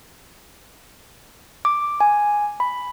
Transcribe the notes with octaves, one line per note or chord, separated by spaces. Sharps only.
D6
G#5
B5